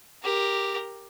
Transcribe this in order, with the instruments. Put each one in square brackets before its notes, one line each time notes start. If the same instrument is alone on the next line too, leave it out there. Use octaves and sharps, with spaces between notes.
[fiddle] G4 A#4